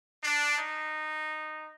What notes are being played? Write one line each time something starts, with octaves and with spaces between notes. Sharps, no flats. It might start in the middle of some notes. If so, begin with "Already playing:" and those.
D4
D#4